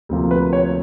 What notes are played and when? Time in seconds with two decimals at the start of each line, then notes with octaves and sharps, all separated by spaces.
0.09 D2 C3 F3 A#3
0.31 B4
0.53 C#5